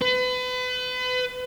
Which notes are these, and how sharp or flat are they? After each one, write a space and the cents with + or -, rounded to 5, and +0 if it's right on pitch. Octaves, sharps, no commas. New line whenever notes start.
B4 +35